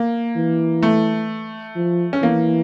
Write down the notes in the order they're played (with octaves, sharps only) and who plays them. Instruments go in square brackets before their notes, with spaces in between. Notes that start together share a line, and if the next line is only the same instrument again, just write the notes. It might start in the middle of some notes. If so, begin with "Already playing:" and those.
Already playing: [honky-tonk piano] A#3
[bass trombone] E3
[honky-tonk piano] A3
[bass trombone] F3
[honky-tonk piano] C#4
[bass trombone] E3 [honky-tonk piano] A#3